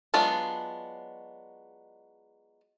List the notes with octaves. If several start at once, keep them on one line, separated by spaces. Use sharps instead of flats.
F#3 G#3 B3 D4 F4